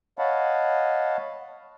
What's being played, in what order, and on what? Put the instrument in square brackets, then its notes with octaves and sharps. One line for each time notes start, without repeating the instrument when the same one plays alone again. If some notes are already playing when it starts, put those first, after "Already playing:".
[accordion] C#5 D#5 F5 F#5 A5 B5